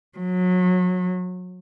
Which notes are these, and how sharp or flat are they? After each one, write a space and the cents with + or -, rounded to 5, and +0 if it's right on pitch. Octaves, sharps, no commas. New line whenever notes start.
F#3 -30